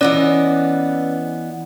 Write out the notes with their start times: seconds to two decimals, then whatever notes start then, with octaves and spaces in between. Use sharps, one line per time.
0.01 E3 B3 C#4 D5 D#5